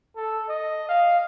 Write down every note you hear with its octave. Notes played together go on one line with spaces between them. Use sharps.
A4
D#5
F5